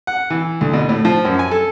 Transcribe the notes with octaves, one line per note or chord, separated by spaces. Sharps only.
F#5
E3
D2
B2
A2
F3
F#2
G#5
A4